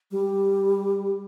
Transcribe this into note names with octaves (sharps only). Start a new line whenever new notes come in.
G3